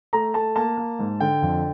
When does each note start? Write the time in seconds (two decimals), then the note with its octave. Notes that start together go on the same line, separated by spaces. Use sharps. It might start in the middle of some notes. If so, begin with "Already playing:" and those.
0.13 A3 A#5
0.34 A3 A5
0.56 A#3 A5
0.77 A#3
0.99 G#2
1.20 D3 G5
1.42 F2